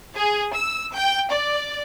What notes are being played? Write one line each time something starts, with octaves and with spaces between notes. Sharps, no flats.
G#4
E6
G5
D5